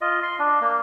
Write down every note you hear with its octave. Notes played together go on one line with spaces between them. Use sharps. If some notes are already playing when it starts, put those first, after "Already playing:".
F4 D#5
C6
D4
A#3